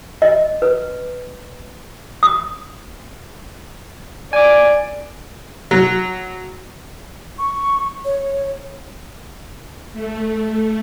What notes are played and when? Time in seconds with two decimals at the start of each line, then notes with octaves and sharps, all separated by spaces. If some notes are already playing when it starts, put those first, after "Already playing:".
0.22 D#5
0.62 B4
2.23 D#6
4.33 D5 G#5 D6
5.71 F#3
7.39 C#6
8.05 C#5
9.93 A3